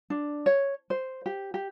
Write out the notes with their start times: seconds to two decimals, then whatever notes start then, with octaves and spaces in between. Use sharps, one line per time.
0.10 D4
0.46 C#5
0.90 C5
1.26 G4
1.54 G4